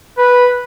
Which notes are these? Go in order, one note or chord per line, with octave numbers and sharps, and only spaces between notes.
B4